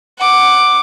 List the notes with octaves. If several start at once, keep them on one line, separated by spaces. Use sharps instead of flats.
F#5 D6